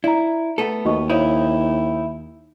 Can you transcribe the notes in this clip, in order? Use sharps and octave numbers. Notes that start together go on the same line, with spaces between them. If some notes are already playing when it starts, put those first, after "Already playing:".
E4 D5 A#5
A3 B3 A4
D#2 F#4 D#5 C#6
D#4 E4 C5 C#5 F5